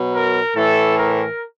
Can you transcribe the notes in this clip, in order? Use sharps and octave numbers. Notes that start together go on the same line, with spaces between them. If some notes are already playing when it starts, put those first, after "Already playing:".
Already playing: B2 F#3
A#4
A2 E3 A4
A#4